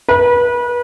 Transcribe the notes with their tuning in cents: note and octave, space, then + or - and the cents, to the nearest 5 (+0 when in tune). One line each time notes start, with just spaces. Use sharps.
B4 -30